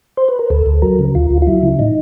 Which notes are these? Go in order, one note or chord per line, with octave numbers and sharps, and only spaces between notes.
C5
B4
A#4
D2 A4
D2
F#3 A#4
C#3
D2 F4
D2
F4
F#3 E4
C#3
A2 D#4